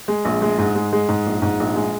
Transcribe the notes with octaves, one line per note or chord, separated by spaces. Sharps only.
G#3
A#1
G#3
G#2
G#3
G#3
G#2
A#1
G#2
A#1
G#3